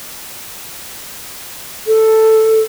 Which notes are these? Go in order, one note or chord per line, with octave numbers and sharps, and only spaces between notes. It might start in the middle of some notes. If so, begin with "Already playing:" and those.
A4